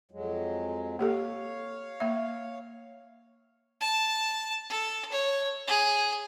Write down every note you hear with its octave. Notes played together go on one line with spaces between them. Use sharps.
F2 F#3 G#3
A#3 G4 A4 C#5 F5
A#3 E5
A5
A4
C#5
G#4